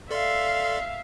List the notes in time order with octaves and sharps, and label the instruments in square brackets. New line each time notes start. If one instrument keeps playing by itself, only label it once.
[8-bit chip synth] A4 D5 C6 [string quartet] E5 F5